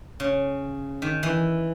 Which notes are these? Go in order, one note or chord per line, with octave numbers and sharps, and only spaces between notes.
C#3
D#3
E3